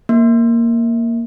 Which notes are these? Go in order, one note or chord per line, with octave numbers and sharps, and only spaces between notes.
A#3